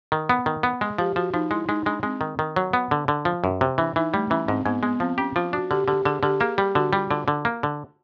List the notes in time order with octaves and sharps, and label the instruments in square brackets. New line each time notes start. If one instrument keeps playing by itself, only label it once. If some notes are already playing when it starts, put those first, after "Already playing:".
[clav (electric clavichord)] D#3
B3
D#3
B3
[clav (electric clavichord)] G#3 [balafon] G#4
[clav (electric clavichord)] F3 [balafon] G4
[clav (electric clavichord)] F3 [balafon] F#4
[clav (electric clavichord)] F3 [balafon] D#4
[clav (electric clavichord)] G#3 [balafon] E4
[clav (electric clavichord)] G#3 [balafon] D#4
[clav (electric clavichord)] G#3 [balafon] D4
[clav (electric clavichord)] G#3 [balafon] C4
[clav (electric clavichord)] D#3
D#3
F#3
B3
D3
D3
F3
F#2
C3
[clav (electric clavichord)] E3 [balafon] D4
[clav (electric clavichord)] E3 [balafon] D#4
[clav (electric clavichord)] G3 [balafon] A3
[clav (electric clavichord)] E3 [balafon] C#4
[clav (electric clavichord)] G#2 [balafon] C4
[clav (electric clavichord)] G#2 [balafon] B3
[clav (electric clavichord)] G#3 [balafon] B3
[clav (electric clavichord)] F3 [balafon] C4
[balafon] C#4 [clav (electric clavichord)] G4
[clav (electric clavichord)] F3 [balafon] F4
[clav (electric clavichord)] D4 [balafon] F#4
[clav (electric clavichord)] D3 [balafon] G4
[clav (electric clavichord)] D3 [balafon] G4
[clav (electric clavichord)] D3 [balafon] G#4
[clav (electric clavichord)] D3 [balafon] G4
[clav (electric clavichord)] A#3 [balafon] G#4
[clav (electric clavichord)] G3 [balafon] G4
[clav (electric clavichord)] D3 [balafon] F#4
[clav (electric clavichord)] G3 [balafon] F4
[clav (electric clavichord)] D3 [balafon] F4
[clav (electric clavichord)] D3
A#3
D3